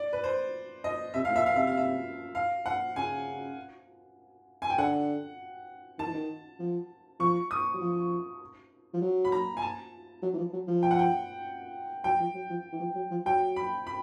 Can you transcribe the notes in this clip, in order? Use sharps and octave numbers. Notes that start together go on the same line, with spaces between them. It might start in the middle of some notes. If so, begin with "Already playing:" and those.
Already playing: D5
B4
C5
D#5
C3 E5
A2 F5
A#2 E5
F5
C3 E5
F5
E5
F5
F#5
C#3 G#5
G#5
G5
D3 F#5
D#3 A5
E3
D#3
F3
F3 C#6
D#6
F#3
F3
F3
F#3
B5
A#5
G#5
A5
F#3
E3
F3
F#3
F3
G5
F#5
G5
F#3 G5
F3
F#3
F3
E3
F3
F#3
F3
F#3 G5
B5
B5